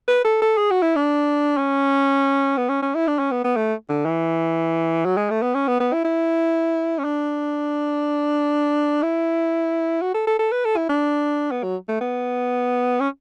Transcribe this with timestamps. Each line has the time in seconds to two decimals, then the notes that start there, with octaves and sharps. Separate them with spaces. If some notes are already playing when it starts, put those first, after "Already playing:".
0.08 B4
0.25 A4
0.42 A4
0.58 G#4
0.71 F#4
0.83 E4
0.96 D4
1.57 C#4
2.58 B3
2.69 C#4
2.82 C#4
2.95 E4
3.07 D4
3.19 C#4
3.31 B3
3.44 B3
3.56 A3
3.89 D3
4.06 E3
5.05 F#3
5.17 G#3
5.30 A3
5.42 B3
5.55 C#4
5.68 B3
5.80 B3
5.93 E4
6.05 E4
6.98 C#4
7.05 D4
9.03 E4
10.02 F#4
10.14 A4
10.27 A4
10.39 A4
10.52 B4
10.65 A4
10.77 E4
10.89 D4
11.51 B3
11.63 F#3
11.89 A3
12.01 B3
13.00 C#4